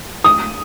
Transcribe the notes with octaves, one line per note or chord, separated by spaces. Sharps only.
D#6